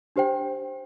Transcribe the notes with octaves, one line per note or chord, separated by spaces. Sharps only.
D4 G4 C5 G5